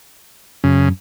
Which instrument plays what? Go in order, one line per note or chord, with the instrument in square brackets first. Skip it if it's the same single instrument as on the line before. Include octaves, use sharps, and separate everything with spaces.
[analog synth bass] F#2 [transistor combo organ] C#3